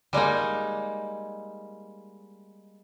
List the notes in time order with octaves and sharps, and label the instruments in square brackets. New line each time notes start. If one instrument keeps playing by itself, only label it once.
[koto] G3 G#3 A#3 D#4